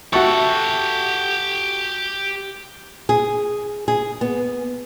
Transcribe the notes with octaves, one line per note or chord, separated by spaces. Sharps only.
F#4 G4 A4 E5 F#5 C#6
G#4
G#4
B3